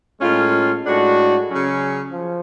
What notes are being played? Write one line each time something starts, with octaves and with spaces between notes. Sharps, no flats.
A2 G#3 C#4 F4
A2 G#3 D4 F#4
C#3 F#3 C#4
F3